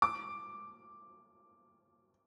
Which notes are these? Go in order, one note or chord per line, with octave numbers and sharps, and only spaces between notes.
D6